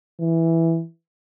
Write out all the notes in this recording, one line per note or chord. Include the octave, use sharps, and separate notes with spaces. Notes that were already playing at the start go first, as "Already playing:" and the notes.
E3